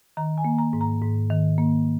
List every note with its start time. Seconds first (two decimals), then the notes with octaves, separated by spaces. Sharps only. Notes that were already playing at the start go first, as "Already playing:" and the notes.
0.17 D#3 A#5
0.38 G#5
0.45 A#3
0.58 A#5
0.73 G#2
0.81 A#5
1.02 G#2
1.30 D#3
1.58 A#3